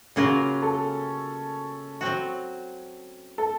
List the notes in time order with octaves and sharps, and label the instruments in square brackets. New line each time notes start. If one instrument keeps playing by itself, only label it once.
[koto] C#3 F#3 A#3 F4 A#4 [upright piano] C#4
[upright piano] A4
[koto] F#3 C4 F#4
[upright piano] A4